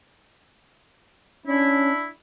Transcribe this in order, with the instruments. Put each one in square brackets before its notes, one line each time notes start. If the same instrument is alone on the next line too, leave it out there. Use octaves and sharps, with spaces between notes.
[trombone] C#4 [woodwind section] D4 E4